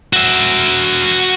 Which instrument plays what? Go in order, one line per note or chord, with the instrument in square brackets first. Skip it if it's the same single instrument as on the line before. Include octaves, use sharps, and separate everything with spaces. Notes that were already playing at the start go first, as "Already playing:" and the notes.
[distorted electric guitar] F#4 E5